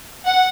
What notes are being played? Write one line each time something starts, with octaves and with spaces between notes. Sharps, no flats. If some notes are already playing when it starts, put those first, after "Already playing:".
F#5